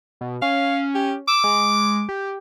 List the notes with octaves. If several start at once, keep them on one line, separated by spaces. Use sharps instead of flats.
B2
C#4 F5
G4
D6 E6
G#3
G4